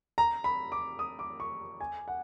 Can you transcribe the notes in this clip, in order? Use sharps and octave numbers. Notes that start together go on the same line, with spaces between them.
A#5
B5
D6
D#6
D6
C#6
G#5
F#5